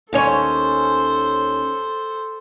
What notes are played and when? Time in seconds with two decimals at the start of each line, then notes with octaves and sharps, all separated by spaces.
0.13 D#2 C#4 A4 C5 C#5